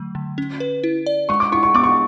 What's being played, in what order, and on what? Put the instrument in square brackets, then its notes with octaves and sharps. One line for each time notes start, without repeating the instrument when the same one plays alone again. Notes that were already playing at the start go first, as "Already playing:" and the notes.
Already playing: [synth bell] D3 F#3 A3
D3
C#4
B4
E4
D5
[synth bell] G#3 [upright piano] C#6
[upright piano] D6
[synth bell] E4 [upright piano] C#6
[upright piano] C#6
[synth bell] B3 [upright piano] D6
[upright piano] C#6